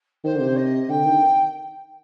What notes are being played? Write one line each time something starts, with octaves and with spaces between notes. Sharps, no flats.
D#3 C5
D3
C3
D#5
D3 G5
D#3